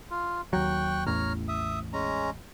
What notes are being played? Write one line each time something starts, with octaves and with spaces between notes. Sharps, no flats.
F4
D#2 F#3 G5 C#6 F#6
A1 E2 C#5 A#5 F6
E5 D#6
G#3 C#4 A#5